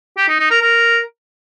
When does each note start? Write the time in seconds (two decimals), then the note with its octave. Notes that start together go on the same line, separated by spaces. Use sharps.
0.17 G4
0.28 D#4
0.39 D#4
0.50 A#4
0.62 A#4